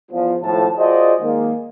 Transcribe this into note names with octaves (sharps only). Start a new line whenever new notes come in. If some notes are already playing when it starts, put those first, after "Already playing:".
E2 F3
G#1 A2 F3 A5
F4 F#4 G#4 C5 D5 D#5
D#3 G#3 A#3